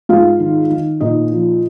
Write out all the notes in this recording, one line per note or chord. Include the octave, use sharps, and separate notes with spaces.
G#2 F4 F5
D#3
D#3
A#2 D#4 D#5
F3